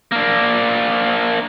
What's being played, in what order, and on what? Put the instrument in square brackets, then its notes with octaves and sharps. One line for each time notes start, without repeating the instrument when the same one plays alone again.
[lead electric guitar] A#3 D4